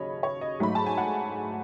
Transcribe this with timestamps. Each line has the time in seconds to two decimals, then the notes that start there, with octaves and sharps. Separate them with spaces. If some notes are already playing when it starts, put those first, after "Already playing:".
Already playing: D#2 C#3 F#3 C#5 D#5 B5
0.23 C#5
0.41 D#5
0.60 G#2 F#3 A3 B5
0.75 A5
0.86 G#5
0.98 F#5